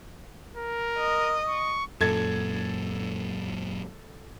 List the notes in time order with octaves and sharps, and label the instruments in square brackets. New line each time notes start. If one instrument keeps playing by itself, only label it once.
[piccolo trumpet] A#4
[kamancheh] D#5
[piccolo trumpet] C#6
[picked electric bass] F#2 A#2 [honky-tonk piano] A4 G#6